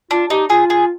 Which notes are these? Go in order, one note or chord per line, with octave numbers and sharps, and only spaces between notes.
D4 F4
D#4 G4
F4 G#4
G#4